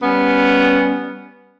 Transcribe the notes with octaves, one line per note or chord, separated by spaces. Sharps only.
G3 B3 C#4